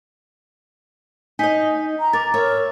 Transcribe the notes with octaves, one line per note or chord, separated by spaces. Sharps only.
D#4 D#5 G#5 G6 B6
A#5
A#4 D6 A6
A#4 C#5 E5